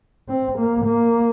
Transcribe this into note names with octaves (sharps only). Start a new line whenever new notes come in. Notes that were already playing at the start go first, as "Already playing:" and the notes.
C4
A#3
A#3